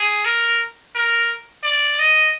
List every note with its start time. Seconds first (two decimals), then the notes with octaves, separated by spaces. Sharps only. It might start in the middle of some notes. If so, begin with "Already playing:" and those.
Already playing: G#4
0.25 A#4
0.95 A#4
1.63 D5
1.99 D#5